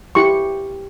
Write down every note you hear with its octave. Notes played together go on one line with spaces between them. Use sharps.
E4 G4 C6 C#6